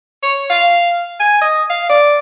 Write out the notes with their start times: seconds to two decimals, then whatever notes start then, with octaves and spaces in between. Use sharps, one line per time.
0.23 C#5
0.50 F5
1.20 G#5
1.41 D#5
1.70 F5
1.90 D5